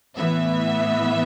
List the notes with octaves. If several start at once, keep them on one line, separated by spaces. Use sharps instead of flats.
A2 E3 B3 E5